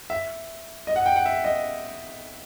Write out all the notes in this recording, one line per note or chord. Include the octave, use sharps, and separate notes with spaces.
E5
D#5
F#5
G5
F#5
E5
D#5